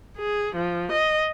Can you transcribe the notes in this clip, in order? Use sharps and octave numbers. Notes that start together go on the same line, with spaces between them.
G#4
F3
D#5